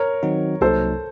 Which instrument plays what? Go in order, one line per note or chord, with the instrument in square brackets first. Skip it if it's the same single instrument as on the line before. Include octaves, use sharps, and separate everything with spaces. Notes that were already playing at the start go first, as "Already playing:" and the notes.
Already playing: [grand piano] A#4 C#5
[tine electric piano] D#3 F#3 C4 D#4 F#4
[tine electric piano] C2 C3 F#3 A#3 D#4 [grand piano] A4 C5